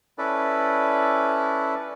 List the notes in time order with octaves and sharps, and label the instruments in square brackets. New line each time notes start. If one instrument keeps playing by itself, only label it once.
[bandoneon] C#4 E4 A4 B4 D5